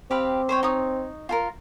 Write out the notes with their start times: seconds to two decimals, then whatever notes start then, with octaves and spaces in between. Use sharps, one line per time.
0.11 C4 G4 F5 B5
0.49 C5 C#5 G5
0.63 D#4 C#5 D#6
1.29 F4 A4 A#4